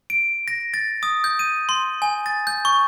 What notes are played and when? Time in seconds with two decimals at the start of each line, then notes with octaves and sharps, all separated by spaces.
0.10 D7
0.48 A#6
0.74 A6
1.03 D#6
1.24 G6
1.39 D#7
1.69 C6
2.02 G#5
2.26 A6
2.47 G6
2.65 C#6